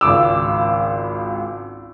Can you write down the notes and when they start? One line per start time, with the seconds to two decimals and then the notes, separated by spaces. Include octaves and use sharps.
0.01 G#1 C#2 D6 E6